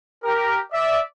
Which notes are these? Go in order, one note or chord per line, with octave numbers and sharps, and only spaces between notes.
G4 A#4
D5 E5